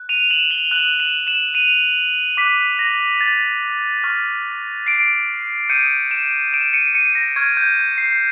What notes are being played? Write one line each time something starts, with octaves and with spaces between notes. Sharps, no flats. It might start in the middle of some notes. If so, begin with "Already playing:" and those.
Already playing: F#6
D#7 F7
E7 F#7
F7 G7
D#6 F#6 E7 F#7
E7 F#7
E7 F#7
D#7 F7
D6 F#6 B6
A#6
A6
C#6 F6
C7 D7
D#6 G6 C#7 D#7
D7 E7
D7 E7
C#7 D#7
C#7 D#7
A#6
C#6 F6 G#6
G6
C7